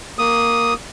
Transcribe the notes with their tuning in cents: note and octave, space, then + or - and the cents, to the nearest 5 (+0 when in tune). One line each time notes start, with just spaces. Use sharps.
A#3 +0 D#6 +0